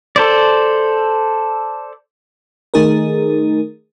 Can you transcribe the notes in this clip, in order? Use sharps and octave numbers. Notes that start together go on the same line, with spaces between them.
A4 C5 D5
D#3 A3 D#4 G#4 A#4